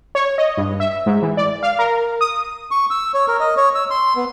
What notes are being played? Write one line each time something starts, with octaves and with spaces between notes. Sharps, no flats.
C#5
D#5
G2
E5
G#2
E3
D5
F5
A#4
D#6
C#6
E6
C#5
A#4
D#5
C#5
E6
C6
B3